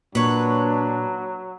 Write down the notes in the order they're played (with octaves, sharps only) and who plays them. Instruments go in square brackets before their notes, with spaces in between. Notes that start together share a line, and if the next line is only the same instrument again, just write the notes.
[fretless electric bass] A#2 [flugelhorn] F#3 [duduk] D4 [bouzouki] B4 C#5